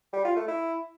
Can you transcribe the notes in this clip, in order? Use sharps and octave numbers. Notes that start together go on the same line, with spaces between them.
G3
F4
A3
E4